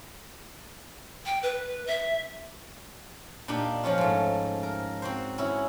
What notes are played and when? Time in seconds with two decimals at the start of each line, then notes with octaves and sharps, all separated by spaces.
1.26 G5
1.43 B4
1.87 E5
3.48 A#2 D4 D#4 G4
3.83 F3 F#3 C#4 F4
3.98 G#2 A3
4.63 A#4
5.02 C4 F#4 C5
5.38 C#4 E4 F#4